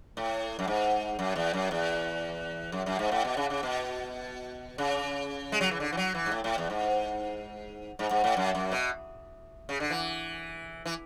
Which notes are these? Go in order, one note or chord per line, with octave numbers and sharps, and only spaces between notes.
A2
F#2
G#2
F#2
E2
F#2
E2
F#2
F#2
G#2
A2
B2
C#3
C#3
B2
C#3
G#3
F#3
E3
D3
E3
F#3
E3
G#2
A2
A2
E2
G#2
G#2
G#2
A2
F#2
F#2
B2
C#3
D3
E3
E3